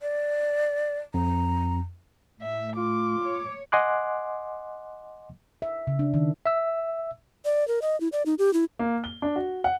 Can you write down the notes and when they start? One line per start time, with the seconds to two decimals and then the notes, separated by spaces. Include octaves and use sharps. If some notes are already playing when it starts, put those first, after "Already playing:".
0.02 D5
1.14 F2 A#5
2.42 A2 E5
2.77 F4 D6
3.22 C#5
3.72 D#5 F#5 G#5 C6 D6 F#6
5.62 E5
5.87 C#3
5.99 D4
6.14 D#3
6.46 E5 E6
7.45 D5
7.68 A#4
7.82 D#5
8.00 E4
8.12 D5
8.26 D#4
8.39 G4
8.53 E4
8.79 A#3
9.04 G7
9.22 D4
9.36 F#4
9.64 F#5